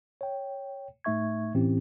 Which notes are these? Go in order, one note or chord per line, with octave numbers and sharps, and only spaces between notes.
C#5 G5
A2 A3 D#4 E5 C#6 G#6
A2 E3 C4 C#4 E4 G4